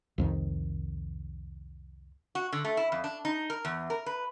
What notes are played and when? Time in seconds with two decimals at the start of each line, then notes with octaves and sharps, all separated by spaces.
0.18 C2 F2 D#3
2.35 F#4
2.52 D3
2.65 A3
2.77 E4
2.92 F2
3.04 D4
3.25 D#4
3.50 A#4
3.65 E2
3.90 A#4
4.06 B4